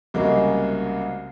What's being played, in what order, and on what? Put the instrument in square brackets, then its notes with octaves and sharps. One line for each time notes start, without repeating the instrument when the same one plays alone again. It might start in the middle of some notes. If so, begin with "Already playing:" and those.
[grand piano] C2 C#3 F#3 G#3 A#3